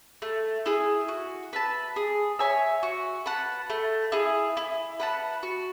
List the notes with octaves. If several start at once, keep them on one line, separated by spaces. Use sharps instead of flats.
A3
E4 G#4
F#4
B4 E5 A5
G#4
C#5 E5 G#5
F#4
B4 F#5 A5
A3
E4 G#4
E4
B4 F#5 A5
F#4